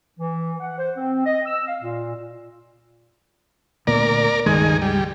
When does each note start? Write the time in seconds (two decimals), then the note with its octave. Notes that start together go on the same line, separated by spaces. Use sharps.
0.19 E3
0.60 F#5
0.79 C5
0.96 C4
1.25 D#5
1.46 E6
1.67 F5
1.82 A#2
3.87 D2 A#2 B3 A#4 D5
4.46 C#2 G2 D#3 G#3 G#4
4.82 G3